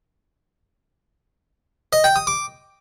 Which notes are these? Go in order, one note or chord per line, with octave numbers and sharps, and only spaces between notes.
D#5
G5
D#6
D6